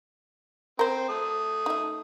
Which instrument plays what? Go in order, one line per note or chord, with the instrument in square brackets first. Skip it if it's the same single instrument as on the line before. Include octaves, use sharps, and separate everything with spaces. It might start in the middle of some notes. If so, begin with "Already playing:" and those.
[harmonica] C4 [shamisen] A#4 C5
[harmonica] A3 D#6
[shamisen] D#4 E5